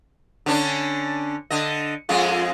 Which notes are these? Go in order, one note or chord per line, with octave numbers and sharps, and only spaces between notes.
D3 C#4 D4
D3 D#5
F2 G#3 F4